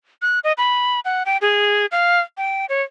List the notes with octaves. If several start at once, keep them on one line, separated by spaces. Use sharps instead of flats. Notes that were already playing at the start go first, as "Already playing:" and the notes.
F#6
D#5
B5
F#5
G5
G#4
F5
G5
C#5